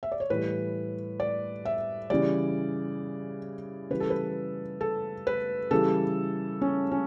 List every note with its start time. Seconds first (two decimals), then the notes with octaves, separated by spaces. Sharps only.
0.03 E5
0.12 D5
0.20 C#5
0.30 A2 E3 G3 B4
1.20 D5
1.65 E5
2.10 C#3 E3 G3 D5
3.90 C#3 E3 G3 B4
4.00 A4
4.10 B4
4.81 A4
5.27 B4
5.71 C#3 E3 G3 A4
6.61 C#4
6.92 C#4